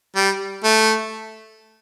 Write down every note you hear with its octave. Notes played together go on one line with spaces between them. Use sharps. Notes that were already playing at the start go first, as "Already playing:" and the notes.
G3
A3